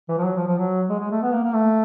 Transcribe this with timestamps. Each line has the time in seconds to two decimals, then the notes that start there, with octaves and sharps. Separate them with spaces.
0.09 E3
0.18 F3
0.25 F#3
0.36 F3
0.47 F3
0.58 F#3
0.90 G#3
1.00 G#3
1.11 A3
1.22 B3
1.33 A#3
1.43 A#3
1.54 A3